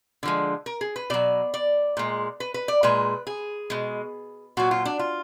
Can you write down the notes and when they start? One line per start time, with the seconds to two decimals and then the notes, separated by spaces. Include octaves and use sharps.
0.23 D3 F3 G#3
0.66 A#4
0.81 G#4
0.96 B4
1.10 B2 F#3 D5
1.54 D5
1.97 A#2 G#3
2.40 B4
2.54 B4
2.68 D5
2.83 A#2 G#3 B4
3.27 G#4
3.70 B2 G#3
4.57 A#2 F#3 F#4
4.71 F4
4.85 D4
4.99 F4